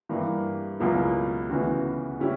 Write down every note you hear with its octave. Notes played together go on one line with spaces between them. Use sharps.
G2 E3 A#3
C#2 B2 F#3 A#3 E4
D2 C#3 E3 B3 F#4
C#3 G3 C#4 E4